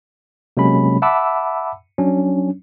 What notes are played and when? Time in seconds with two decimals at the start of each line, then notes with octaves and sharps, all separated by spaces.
0.57 C3 F#3 G#3 A#3 C#4 B5
1.02 E5 F#5 A5 B5 D6 E6
1.98 F#3 C#4 D4